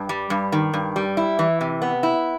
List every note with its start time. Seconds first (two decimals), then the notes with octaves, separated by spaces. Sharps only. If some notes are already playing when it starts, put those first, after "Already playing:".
Already playing: G2
0.09 G3
0.30 G2
0.52 D#3
0.74 G2
0.96 G3
1.17 E4
1.39 E3
1.61 C3
1.82 B3
2.03 E4